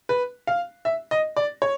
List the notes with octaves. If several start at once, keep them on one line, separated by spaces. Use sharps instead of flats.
B4
F5
E5
D#5
D5
C#5